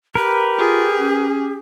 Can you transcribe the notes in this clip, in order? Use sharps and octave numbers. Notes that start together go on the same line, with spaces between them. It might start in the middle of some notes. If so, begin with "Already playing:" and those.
G4 A#4 B4
F4 G#4
C#4